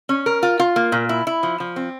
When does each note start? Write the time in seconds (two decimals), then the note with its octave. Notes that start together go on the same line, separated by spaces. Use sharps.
0.09 C#4
0.26 A#4
0.43 F4
0.59 F4
0.76 A#3
0.92 A#2
1.09 E4
1.27 E4
1.43 F3
1.60 F3
1.76 C4